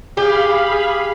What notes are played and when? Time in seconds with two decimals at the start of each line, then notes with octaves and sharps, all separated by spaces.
0.17 G4 G#4 F5 B5
0.71 G#4